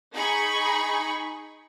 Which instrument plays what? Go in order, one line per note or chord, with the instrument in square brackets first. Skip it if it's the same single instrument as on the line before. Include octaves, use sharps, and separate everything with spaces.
[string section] D#4 G#4 B5 C#6